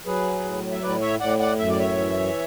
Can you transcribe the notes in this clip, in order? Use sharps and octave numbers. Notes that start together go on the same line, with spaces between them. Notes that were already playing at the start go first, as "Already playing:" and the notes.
F#3 G#4 B4
A2
E5
A2 B4 D5
C#5 E5
A2 D5 F#5
D5 F#5
F#2 E5
D5
C#5 E5
E3